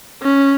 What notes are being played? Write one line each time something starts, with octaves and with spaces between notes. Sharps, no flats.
C#4